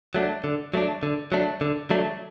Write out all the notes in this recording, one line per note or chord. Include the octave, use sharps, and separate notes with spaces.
F#3 A3 D4
D3
F#3 A3 D4
D3
F#3 A3 D4
D3
F#3 A3 D4